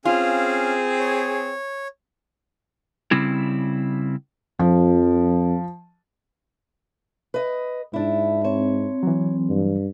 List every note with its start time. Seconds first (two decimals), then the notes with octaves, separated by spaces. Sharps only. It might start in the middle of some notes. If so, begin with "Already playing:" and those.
0.05 C4 C#4 F4 G#4 F5
0.99 C#5
3.11 C#3 G3 C4 E4
4.59 F2 F3
7.34 B4 D#5
7.94 G#2 D4 E4
8.45 C4 C#5
9.03 E3 F#3
9.49 G2